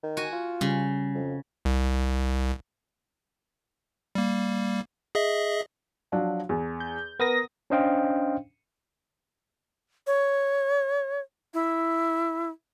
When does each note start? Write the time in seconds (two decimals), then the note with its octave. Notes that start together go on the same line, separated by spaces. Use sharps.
0.03 D#3
0.17 F#4 G#5
0.33 F4
0.61 C#3 G3
1.15 F2
1.65 C2
4.15 G3 A#3
5.15 G#4 D#5 E5
6.12 F3 F#3 D4
6.49 E2
6.80 G6
7.20 B3 A#4 D#6 A#6
7.70 C#4 D4 C5 D#5 F5 G5
10.07 C#5
11.54 E4